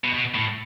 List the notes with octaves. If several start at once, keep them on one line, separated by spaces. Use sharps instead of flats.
B2
B2
A2